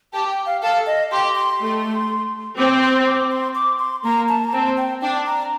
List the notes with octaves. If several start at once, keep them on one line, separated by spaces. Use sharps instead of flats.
G4 A5
G5
F5
A4 F5
D#5
G4 C6
C6
A3
C4 D6
C6
D6
C6
D6
C6
A#3 A#5
A5
A#5
C4 A5
G5
D4 G5
A#5